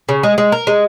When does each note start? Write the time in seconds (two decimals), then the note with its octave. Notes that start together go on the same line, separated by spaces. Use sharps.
0.09 C#3
0.23 G#3
0.38 G#3
0.52 A#4
0.67 G#3